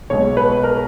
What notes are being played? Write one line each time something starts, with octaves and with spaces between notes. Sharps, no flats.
B1 B2 G#3 C#5
B4
A#4